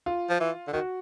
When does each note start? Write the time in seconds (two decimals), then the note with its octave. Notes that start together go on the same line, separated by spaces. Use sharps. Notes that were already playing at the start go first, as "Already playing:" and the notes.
0.06 F4
0.30 F3
0.40 E3
0.68 D3
0.73 D#3 F#4